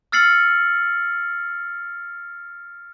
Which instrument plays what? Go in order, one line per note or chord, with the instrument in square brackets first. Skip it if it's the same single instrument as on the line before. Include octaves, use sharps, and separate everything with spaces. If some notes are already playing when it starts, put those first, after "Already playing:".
[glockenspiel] E6 F6 A6 C7 C#7 F#7